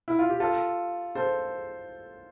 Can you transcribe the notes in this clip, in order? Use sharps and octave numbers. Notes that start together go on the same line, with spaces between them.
E4
F4
G4
F4 A4
A4 C5